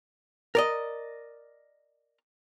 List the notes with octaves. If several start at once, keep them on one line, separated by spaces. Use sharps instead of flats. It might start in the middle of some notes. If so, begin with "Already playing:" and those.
A#4 D5 D#5